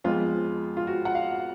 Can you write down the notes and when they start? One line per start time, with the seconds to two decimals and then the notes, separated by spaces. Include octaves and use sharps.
0.04 F2 F3 G#3 B3 F4
0.77 F4
0.87 F#4
1.05 F#5
1.15 F5